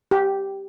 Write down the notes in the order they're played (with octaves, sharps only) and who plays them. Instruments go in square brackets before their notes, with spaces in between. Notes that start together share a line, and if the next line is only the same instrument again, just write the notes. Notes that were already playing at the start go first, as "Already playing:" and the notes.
[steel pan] G4